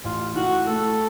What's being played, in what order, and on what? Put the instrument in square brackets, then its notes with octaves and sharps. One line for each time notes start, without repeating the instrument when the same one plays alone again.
[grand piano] A1 [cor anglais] F4
[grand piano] A2 [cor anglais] F#4
[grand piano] A3 [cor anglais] A4